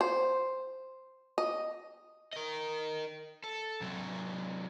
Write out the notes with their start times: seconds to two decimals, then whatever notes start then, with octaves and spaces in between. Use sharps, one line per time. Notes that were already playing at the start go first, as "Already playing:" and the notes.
0.01 C5
1.38 D#5
2.33 A#4 D#5
3.44 A4
3.81 C3 F#3